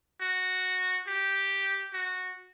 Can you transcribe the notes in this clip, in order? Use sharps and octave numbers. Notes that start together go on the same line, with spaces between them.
F#4
G4
F#4